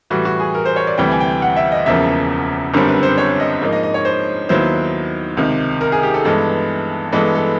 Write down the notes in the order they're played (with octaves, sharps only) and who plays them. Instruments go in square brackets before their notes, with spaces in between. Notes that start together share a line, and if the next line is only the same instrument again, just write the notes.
[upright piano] A2 E3 G3 F#4
F#4
G#4
A#4
C5
C#5
D5
D2 C3 E3 G3 G5
G#5
G5
F#5
E5
D#5
E1 E2 C#3 F3 A#3 E5
G1 F#2 D3 G3 C4 A#4
B4
C5
C#5
D#5
G#2 F3 A#3 D#4
D#5
D#5
C#5
C5
D#2 D#3 F#3 B3 E4 C5
C#2 C3 D#3
A#4
G#4
G4
A4
G2 E3 G#3 B3 A4
G2 E3 G#3 B3 A4
A4